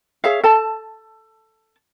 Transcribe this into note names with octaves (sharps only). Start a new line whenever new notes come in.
G#4 C#5 E5 F5
A4 A5